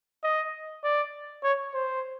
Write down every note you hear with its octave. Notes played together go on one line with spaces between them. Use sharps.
D#5
D5
C#5
C5